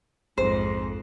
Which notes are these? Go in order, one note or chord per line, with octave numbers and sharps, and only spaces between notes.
A#1 F2 G#2 C5